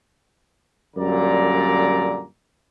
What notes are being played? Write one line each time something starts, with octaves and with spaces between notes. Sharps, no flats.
F#2 A#2 D3 G3 D5 A#5